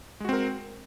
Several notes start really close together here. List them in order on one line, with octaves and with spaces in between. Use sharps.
G#3 F#4 C4 A#4